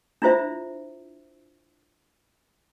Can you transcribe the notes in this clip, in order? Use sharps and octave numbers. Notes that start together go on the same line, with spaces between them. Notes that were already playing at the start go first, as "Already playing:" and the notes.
D4 E4 F4 C5 E5